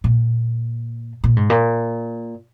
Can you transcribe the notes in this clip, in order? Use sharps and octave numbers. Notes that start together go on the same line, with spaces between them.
A#2
A#2
G#2
A#2